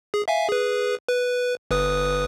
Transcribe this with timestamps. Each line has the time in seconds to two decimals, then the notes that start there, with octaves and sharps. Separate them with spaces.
0.14 G#4
0.28 E5 F5 G#5
0.49 G#4 B4
1.09 B4
1.71 G1 B4 D#6